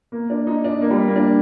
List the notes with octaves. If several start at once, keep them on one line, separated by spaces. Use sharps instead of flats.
A#3
D4
D#4
D4
A#3
G3
A#3
D4